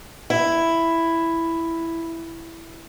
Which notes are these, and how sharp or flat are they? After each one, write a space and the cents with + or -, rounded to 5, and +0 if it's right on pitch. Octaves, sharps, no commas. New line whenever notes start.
E4 +5